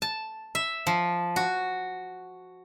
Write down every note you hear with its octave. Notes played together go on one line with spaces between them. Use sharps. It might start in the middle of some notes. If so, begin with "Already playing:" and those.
A5
E5
F3
F#4